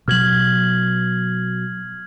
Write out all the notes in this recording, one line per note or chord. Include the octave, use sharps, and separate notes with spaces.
B2 F#3 F6 G#6 F#7